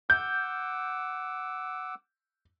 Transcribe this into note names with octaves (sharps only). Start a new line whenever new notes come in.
F#5 D6 E6 G6